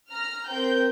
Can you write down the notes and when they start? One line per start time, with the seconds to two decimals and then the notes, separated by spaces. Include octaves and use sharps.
0.10 A#5 F6
0.49 C4 A#4 G5 G6